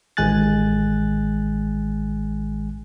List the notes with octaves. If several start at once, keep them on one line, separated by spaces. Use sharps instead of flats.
A1 D#3 G#3 G#5 F#6 A6